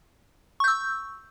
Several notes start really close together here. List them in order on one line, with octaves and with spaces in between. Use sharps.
C#6 G6 E6